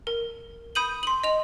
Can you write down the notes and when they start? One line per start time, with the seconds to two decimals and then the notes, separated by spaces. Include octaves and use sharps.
0.07 A#4
0.75 B5 D#6 G6 D#7 F#7
1.03 C6 F#7
1.24 D#5 F7